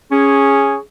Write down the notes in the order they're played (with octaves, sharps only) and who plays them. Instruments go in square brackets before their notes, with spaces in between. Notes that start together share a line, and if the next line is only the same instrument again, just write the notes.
[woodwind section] C#4 G#4